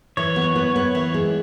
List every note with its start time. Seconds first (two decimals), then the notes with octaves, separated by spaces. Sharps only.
0.17 E3 C#5
0.36 B3
0.55 B3
0.76 B3
0.95 E3
1.14 G#3